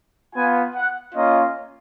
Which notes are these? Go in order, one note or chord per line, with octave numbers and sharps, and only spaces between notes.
B3 F4 G#5
F#5
A#3 C#4 F4 D#5